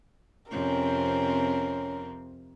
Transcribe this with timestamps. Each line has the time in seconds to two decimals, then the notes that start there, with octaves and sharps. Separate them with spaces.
0.51 F2 C3 C4 C#4 A#4